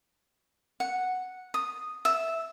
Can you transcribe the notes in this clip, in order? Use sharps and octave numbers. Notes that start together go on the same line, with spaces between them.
F#5
D#6
E5